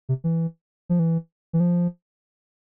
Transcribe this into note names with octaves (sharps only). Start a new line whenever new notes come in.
C3
E3
F3
E3
E3
F3